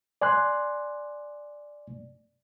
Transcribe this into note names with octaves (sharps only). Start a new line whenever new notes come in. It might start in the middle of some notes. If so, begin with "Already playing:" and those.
D5 G#5 C6 F#6